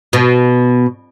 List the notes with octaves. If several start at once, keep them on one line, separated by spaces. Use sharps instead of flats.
B2